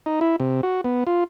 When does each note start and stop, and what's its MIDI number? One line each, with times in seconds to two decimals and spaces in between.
0.06 0.20 63
0.21 0.36 64
0.40 0.61 48
0.63 0.81 66
0.84 1.04 59
1.07 1.24 65